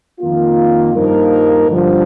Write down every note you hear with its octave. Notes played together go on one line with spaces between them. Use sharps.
F2 D#3 A#3 F4
G2 F3 A#3 D#4 A#4
G2 D3 F3